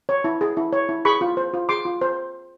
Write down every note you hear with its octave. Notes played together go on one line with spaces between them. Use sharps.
C#5
E4
G#4
E4
C#5
E4
G#4 B5 C#6
F4
C5
F4
G#4 C6 D6
F4
C5